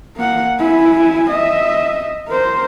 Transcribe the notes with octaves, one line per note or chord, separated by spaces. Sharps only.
A#3 F#5
E4 G#5
D#5 E5
A#4 C5